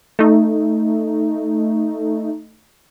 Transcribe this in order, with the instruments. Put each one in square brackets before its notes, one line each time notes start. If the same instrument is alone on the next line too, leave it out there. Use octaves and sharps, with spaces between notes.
[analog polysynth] A3 D#4